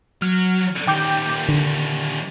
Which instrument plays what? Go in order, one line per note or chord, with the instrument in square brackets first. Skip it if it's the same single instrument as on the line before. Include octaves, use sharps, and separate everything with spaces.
[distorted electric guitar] F#3 [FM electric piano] F6
[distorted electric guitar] D#3 G3 [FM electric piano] G5 D6 G6
[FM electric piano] D3